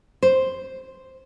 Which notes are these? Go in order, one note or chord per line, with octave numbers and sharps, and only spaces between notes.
C5